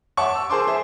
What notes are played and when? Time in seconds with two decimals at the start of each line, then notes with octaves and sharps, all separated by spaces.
0.17 C#5 E5 F#5 A5 C#6 D6
0.35 E6
0.50 G#4 A#4 C5 A5 C6 D6
0.67 G#4 C5 E5